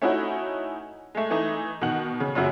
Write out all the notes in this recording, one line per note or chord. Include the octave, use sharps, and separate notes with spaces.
A3 C#4 D#4 E4 F#4
G#3 A3
E3 A3 D#4
B2 D#3 F#5 F#7
C#3
F#1 F#2 C#3 F#4 E5